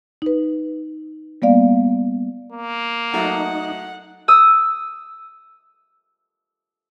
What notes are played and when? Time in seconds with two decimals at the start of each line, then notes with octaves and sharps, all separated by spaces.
0.22 D#4 B4
1.42 G3 A#3 B3 D5 F5
2.52 A#3
3.14 F#3 A3 D#4 F#5
4.28 D#6 E6